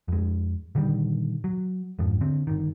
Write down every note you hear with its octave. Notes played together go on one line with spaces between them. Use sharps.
F2 G#3
A#2 D3 D#3 G3
F#3
F2 G#2 F3
D3 C4
G1 D#3